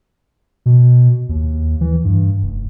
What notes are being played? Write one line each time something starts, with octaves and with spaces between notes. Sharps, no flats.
B2
D#2
E3
G2
F1